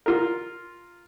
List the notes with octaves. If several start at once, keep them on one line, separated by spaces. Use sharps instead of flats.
F4 A#4